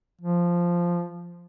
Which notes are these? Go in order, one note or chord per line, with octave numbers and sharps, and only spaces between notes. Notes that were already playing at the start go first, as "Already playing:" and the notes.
F3